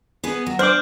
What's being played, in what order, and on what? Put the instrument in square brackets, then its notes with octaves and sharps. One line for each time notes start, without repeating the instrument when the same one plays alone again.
[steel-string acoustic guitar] B3 G#4 B4
F#3
[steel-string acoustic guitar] D4 [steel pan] C5 D6 [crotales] F6 G6 F#7